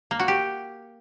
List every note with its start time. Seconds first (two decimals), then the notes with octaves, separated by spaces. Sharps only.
0.11 A#3
0.19 F#4
0.28 G4